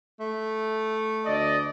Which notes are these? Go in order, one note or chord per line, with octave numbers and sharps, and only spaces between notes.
A3
D2 D5 D#5